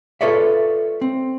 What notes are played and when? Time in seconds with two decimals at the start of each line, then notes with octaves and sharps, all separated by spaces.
0.21 F4 A4 B4 C#5 D5 E5
1.01 C4